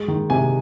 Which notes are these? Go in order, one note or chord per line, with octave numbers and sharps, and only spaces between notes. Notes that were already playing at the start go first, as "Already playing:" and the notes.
Already playing: G#3
D#3
C3 G#5